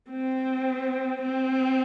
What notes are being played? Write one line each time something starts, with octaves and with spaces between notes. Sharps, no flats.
C4
C4